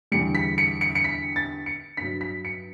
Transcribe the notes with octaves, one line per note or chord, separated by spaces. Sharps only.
E2 D3 G3 C#7
B6
C#7
C#7
C#7
B6
A6
C#7
G2 F#3 B6
B6
C#7